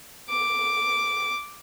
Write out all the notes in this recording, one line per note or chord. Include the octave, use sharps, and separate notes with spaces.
D6